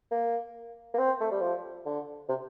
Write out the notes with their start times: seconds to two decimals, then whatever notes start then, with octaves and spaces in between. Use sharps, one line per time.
0.11 A#3
0.94 A#3
0.98 C4
1.21 A3
1.31 G3
1.41 F3
1.85 D3
2.29 C3